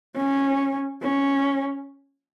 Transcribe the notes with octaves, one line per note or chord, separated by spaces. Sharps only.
C#4
C#4